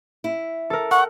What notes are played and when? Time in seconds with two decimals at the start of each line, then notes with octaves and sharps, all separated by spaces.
0.24 E4
0.70 A4 A#4
0.91 F#5 C#6